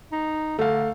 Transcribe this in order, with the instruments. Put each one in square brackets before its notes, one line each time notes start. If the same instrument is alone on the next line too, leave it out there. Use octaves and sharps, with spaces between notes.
[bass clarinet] D#4
[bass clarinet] D3 [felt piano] A3 F5